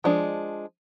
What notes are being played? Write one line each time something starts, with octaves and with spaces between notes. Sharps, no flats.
F3 G#3 D4